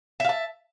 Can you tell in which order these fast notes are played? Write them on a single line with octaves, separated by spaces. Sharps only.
E5 F5 A5